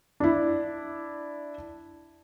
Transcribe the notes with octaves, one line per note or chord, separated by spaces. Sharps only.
D4 E4